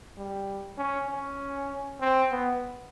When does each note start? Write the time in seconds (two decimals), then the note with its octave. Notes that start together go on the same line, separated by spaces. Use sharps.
0.17 G3
0.78 C#4
1.09 C#4
2.01 C4
2.31 B3